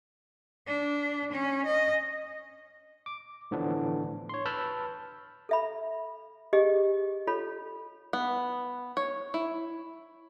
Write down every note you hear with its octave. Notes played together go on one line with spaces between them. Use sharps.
D4
C#4
D#5
D6
A2 D3 E3 F3 B3 D4
C#5 C6
B4 A5 B5 E6 F6 G6
A4 E5 B5
G4 G#4 D#5
F4 A4 C#5 B5
B3
C#5
E4